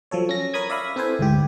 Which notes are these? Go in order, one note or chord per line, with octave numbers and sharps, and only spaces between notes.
F3 F#3 A4 C#5
C#4 A#6
A#4 C#5 B5 D#6 G#6
D5 E5 F5 B5
C4 E4 A4 B4 C5 G#5
D2 G#2 G4